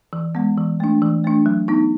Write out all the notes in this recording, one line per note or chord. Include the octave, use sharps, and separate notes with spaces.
E3
G#3 B3
E3
A3 D4
E3
A3 D4
F#3
B3 D#4